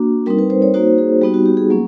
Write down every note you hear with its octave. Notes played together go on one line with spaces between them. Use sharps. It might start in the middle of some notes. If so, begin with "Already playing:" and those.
Already playing: A#3 D4 F#4
G3 C4 D#4 A#4
B4
C5
C#5
A#3 D#4 F#4 C5
G#4
G3 B3 D#4 F#4 G4
F#4
G4
G#4
F#3 A#3 C#4